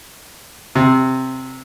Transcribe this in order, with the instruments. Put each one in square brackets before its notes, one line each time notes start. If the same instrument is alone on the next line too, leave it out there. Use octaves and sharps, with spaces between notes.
[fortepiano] C3